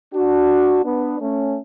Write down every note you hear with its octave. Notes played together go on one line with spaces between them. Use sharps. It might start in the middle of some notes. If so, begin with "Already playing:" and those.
D4 F#4
B3 D4
A3 C#4